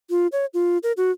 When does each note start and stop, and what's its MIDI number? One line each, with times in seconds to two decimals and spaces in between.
0.10 0.27 65
0.32 0.46 73
0.54 0.78 65
0.83 0.92 70
0.97 1.11 66